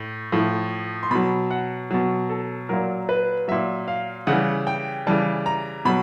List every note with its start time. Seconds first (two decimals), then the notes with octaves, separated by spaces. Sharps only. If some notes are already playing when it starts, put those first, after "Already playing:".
Already playing: A2
0.32 A2 F3
1.03 C6
1.11 B2 F#3 B5
1.51 F#5
1.91 B2 F#3
2.29 A4
2.69 A#2 F#3 A#4
3.09 B4
3.48 A#2 F#3 E5
3.88 F5
4.27 C#3 E3 G3 F#5
4.67 G5
5.07 C#3 E3 G3 A5
5.46 A#5
5.85 B2 F#3 B5